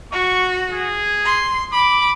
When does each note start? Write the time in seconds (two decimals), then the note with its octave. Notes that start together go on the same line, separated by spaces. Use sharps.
0.13 F#4 C#6
0.70 G#4
1.25 C6
1.73 B5 D6